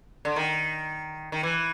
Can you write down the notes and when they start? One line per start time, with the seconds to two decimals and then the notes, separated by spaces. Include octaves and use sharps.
0.25 D3
0.36 D#3
1.32 D#3
1.43 E3